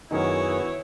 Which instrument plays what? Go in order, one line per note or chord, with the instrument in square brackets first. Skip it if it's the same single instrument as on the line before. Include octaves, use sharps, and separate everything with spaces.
[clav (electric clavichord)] F#2 D#3 D#4 [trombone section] B3 F#4 G#4 [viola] E4 C#5